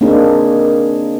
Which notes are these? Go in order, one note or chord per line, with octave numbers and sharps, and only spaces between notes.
A#3 C4 D4 D#4 G#4